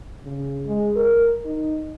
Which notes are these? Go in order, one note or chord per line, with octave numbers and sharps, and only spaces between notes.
C#3
G#3
A#4
D#4